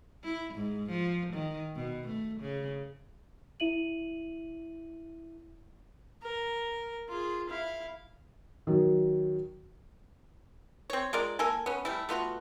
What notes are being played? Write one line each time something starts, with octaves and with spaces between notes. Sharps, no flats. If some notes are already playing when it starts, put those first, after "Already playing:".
E4
G#2
F3
D#3
B2
A3
C#3
E4 E5 D#7 F#7
A#4
F4 G#4
E4 F5
D#3 F#3
C4 C#5
G#3 F4 A#4 D5
A#3 A4 A#4 G#5
B3 C#4
G3 A3 E4
A3 B3 F4 F#4